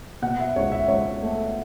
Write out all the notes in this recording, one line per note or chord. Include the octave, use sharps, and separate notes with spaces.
B2 F#5
E5
C#2 C#5
E5
C#2 C#5
A3